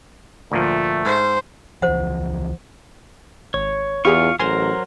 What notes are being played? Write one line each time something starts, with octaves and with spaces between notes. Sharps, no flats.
D2 A#2 F3 A3
G#2 C5
C#2 E3 F3 C5 F#5
G#1 C#5
E2 E4 F4 G4 G#4 F5 C#6
A1 F#3 A#4 C5 G#5 C6